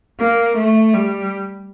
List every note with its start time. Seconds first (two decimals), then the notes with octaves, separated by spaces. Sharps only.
0.20 A#3
0.58 A3
0.94 G3